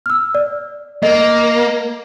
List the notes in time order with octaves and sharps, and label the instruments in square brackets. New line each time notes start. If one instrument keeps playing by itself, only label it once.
[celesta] E6 F6
D5
[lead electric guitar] A#3 [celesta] A#4 D#5